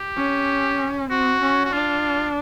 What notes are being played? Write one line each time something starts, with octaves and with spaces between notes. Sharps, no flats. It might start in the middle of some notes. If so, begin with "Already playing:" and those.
Already playing: G4
C#4
C4 F#4
C#4
F#4
D4 F4